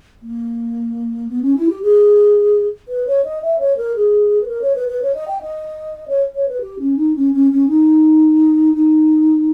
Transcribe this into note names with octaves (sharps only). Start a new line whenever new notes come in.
A#3
B3
C#4
E4
G4
G#4
B4
C#5
D#5
E5
C#5
A#4
G#4
B4
A#4
C#5
B4
B4
C#5
D#5
G5
D#5
C#5
C#5
B4
G4
C#4
D#4
C#4
C#4
C#4
D#4
D#4